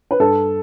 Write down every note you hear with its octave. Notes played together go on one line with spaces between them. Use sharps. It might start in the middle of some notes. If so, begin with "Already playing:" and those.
B4
G2 A4